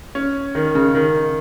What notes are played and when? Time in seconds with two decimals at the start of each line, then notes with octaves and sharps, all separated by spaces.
0.15 C#4
0.55 D#3
0.75 C#3
0.95 D#3